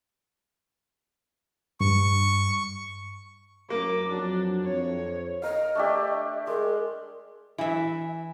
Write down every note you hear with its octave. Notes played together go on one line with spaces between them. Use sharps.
G2 C#6
F#2 A#3 D6
F2 F#3 D4
F2 C#5
A#4 D#5 F5
A3 D4 G4
G#3 A#4
E3 E5